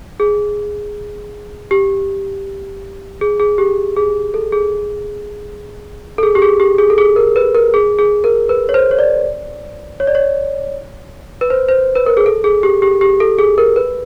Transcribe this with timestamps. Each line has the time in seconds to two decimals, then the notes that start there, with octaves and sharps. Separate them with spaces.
0.20 G#4
1.71 G4
3.21 G#4
3.40 G#4
3.58 G4
3.96 G#4
4.34 A4
4.52 G#4
6.18 A4
6.23 G#4
6.35 G4
6.42 G#4
6.60 G4
6.78 G#4
6.90 A4
6.98 G#4
7.16 A#4
7.36 B4
7.55 A#4
7.74 G#4
7.99 G#4
8.24 A#4
8.49 B4
8.69 C#5
8.74 C5
8.91 C#5
8.99 D5
10.00 C#5
10.07 D5
10.15 C#5
11.41 B4
11.50 C5
11.69 C5
11.95 B4
12.06 A#4
12.17 G#4
12.26 A4
12.44 G#4
12.63 G4
12.82 G4
13.01 G4
13.20 A4
13.39 G#4
13.58 A#4
13.76 B4